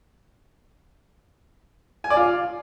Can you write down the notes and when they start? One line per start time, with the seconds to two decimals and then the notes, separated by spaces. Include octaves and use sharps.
2.04 G#5
2.10 D5
2.17 F4